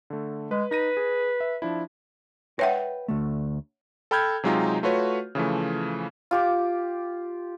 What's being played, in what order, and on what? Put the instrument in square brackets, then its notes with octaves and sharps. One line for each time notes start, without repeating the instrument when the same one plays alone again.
[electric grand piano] D3 A3
[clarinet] G#3 [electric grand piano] B4
[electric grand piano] D#4 A#6 D#7 [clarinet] B4
[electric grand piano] G#4
E5
F3 D4 E4
[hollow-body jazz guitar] B4 G5 [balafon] C#5 E5 F#5
[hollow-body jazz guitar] D2 A3
[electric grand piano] A4 G5 B5 F6 G6 G#6
C3 F#3 G#3 D#4 F4 G4
A3 F4 F#4 B4 C#5
C#3 E3 F3 A3
[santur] F4 G4 D6